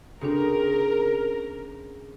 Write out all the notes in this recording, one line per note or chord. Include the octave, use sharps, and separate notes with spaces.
C#3 C4 D4 F#4 A4 A#4